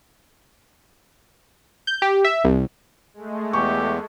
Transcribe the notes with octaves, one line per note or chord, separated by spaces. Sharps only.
G6
G4
E5
C2
G#3 A3
E2 G4 C#6